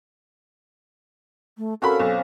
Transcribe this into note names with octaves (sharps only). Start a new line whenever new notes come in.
A3
C4 C#4 F#4 A4 A#4 F5 B5
B1